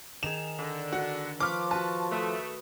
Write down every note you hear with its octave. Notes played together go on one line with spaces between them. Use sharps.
D#3 G#4 E7 F7
D3
F#4
F3 B4 C#6 D6 F6
F#4 B4 A5
A3 B4 D#6